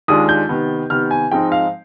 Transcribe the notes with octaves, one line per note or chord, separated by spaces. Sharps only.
D#2 D#3 G#3 D4 F4 D#6
G6
C3 D#3 B3
C3 D#3 B3 F6
G#5
G#2 F3 G#3 C4 D#4 G5
F5